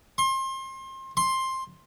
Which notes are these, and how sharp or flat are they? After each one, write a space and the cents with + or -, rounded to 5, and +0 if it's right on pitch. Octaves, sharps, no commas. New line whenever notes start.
C6 +30
C6 +10